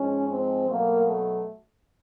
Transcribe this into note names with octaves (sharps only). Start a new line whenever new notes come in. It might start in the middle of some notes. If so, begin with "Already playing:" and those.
Already playing: G#2 F3 G#3 C#4
C4
B2 F#3 A3 A#3
A3